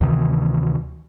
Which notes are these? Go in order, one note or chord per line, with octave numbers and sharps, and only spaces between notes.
D2 C3 D#3 E3